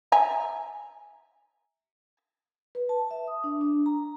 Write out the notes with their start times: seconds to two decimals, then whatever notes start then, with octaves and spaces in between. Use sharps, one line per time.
0.12 E5 G#5 A#5
2.75 B4
2.89 A5
3.11 E5
3.27 D#6
3.44 D4
3.61 D4
3.86 A#5